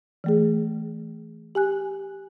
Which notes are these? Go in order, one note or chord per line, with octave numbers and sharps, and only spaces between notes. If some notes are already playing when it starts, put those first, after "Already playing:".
E3 A3 G#4
G4 G#5 F#6